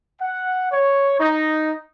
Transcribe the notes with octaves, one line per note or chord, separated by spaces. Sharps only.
F#5
C#5
D#4